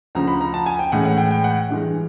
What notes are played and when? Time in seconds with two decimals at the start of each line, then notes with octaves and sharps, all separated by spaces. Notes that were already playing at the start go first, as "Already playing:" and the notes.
0.15 D2 C#3 F3 A#5
0.28 B5
0.41 A#5
0.54 A5
0.66 G#5
0.79 G5
0.92 A2 E3 G#3 C#4 F#5
1.05 F#5
1.18 G5
1.31 G5
1.44 F#5
1.70 G2 E3 G#3